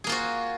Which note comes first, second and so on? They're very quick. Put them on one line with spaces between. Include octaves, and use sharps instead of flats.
G#4 A#3 F4 F#4